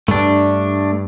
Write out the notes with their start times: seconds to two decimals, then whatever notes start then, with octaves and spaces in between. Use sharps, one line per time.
0.08 G2 G3 A3 D4